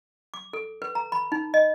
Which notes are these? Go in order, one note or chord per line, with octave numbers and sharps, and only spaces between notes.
D6
A4
B4
A#5
B5
D#4
D#5